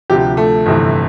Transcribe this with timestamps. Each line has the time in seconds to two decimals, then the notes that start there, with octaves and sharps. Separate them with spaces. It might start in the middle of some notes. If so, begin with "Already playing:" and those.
0.10 D2 C3 F3 G4
0.37 A3
0.66 G1 F2 C3 E3